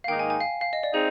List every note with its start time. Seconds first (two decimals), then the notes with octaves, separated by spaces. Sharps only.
0.04 F5
0.08 G#2 D#3 A#3 D#4 G5
0.19 G#5
0.30 G#5
0.40 F5
0.61 F5
0.73 D#5
0.83 D5
0.94 C4 D#4 G#4